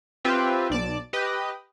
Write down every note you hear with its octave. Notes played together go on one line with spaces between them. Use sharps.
C4 F4 G4 B4 E5 G5
B1 D5 A5 D6
G4 B4 D#5